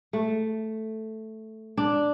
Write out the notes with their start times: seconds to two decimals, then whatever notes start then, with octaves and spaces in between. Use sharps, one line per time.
0.13 A3
1.77 D4